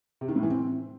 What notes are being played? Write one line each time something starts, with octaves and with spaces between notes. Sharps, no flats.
C3
D#3
A2
E3
C4